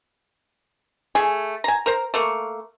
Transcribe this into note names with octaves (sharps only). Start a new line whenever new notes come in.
A3 G#4 G#5
G#5 A#5
A#4 C5 A#5
A3 A#3 C#6